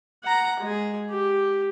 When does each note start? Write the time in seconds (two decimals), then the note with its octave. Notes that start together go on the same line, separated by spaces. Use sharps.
0.23 F#5 A#5
0.60 G#3 G#4
1.10 G4